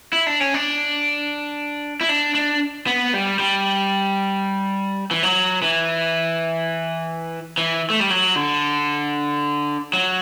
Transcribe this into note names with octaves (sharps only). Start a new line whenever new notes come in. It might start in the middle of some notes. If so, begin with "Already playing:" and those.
E4
D4
C#4
D4
E4
D4
D4
B3
G3
G3
E3
F#3
E3
E3
A3
G3
F#3
D3
F#3